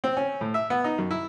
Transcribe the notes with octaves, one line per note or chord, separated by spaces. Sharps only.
C4
C#4
A2
E5
B3
D#4
F#2
E4